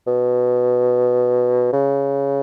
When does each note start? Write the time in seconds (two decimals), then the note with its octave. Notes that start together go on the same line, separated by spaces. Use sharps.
0.07 B2
1.73 C#3